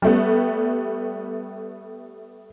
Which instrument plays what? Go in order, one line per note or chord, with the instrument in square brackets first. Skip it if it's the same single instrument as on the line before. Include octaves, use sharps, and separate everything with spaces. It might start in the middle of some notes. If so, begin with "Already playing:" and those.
[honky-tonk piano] G3 A3 B3